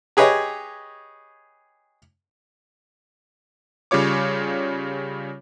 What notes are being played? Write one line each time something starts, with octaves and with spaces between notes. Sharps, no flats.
G4 G#4 B4 C#5 D#5
C#3 G3 F4 C#5 D6